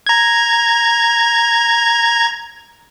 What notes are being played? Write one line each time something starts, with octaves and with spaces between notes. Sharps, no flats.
A#5 G#6